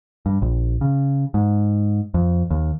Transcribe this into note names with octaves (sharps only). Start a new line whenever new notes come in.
G2
A#1
C#3
G#2
F2
D#2